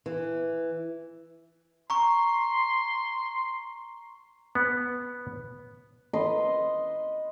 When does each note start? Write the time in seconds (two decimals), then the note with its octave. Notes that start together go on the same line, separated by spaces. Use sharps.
0.06 E3
1.90 A#5 C6 C#6
4.55 B3
6.13 B4 D#5 C6